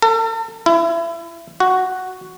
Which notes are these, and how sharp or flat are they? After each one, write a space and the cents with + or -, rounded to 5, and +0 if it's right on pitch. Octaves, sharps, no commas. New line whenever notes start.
A4 +40
E4 +30
F#4 +5